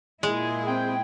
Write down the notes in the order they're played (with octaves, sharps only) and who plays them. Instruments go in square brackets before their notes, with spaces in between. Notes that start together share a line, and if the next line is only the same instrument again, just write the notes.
[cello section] A#2 E4 G#4 [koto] G#3
[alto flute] C4 [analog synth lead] G5